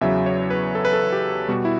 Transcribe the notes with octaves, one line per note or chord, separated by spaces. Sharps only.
E2 C#3 F#3 E5
C#5
B4
A4
B4
A4
G4
B2 G3 F#4
E4